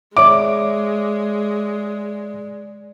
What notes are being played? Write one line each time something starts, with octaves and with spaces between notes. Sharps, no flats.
G#3 C#5 D5 E5 D6